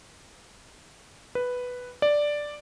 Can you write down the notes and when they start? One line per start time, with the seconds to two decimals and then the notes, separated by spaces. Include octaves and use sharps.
1.35 B4
2.02 D5